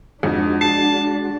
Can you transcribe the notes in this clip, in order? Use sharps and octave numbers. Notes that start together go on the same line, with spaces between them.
F2 G#3 D4 D#4 F#4
A5 C7